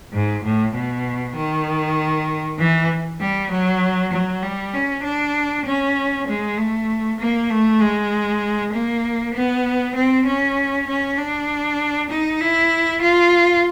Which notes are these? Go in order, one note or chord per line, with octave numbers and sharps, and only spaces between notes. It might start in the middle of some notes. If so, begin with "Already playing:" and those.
G#2
A2
B2
D#3
E3
G3
F#3
F#3
G3
C#4
D4
C#4
G#3
A3
A#3
A3
G#3
A#3
B3
C4
C#4
C#4
D4
D#4
E4
F4